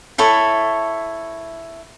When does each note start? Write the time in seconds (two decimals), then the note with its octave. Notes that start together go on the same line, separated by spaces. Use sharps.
0.18 E4 A4 C#5 E5